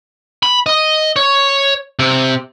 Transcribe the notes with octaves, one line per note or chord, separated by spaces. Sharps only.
B5
D#5
C#5
C3